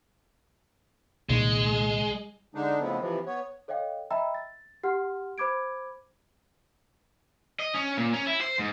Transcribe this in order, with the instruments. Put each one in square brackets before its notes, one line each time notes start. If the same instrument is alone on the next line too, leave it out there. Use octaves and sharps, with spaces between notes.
[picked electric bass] C2 A#2 D#3 [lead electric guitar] G#3
[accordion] D3 G#3 D4 D#4
A2 C#3 F3 G#3 B3 C4
C3 E3 F3
B3 C#5
[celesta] A4 C#5 D#5 F5 G5
D#5 E5 G5 A#5 B5 E6
A6
G4 F#5 C6 F6
C5 B5 D6 G#6 D7
[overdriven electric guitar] D#5
C#4
A#2
C#4
E4
C5
G#2